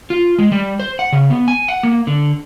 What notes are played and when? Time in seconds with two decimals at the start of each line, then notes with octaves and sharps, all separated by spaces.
0.10 F4
0.39 G#3
0.52 G3
0.80 C5
0.99 F#5
1.12 C#3
1.30 B3
1.48 G#5
1.68 F#5
1.83 A#3
2.07 D3